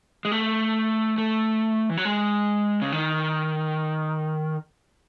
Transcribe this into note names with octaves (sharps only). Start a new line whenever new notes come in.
G#3
A3
A3
E3
F#3
G#3
C#3
D#3